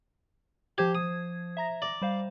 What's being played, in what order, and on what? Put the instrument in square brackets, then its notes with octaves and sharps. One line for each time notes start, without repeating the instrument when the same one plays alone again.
[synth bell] F3 C5 G#6 [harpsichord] G4
[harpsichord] D#6
[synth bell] E5 A#5 A#6
[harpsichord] D5
[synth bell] G3 C5 F5